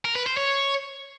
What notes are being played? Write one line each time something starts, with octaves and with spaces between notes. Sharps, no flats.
A#4
B4
C5
C#5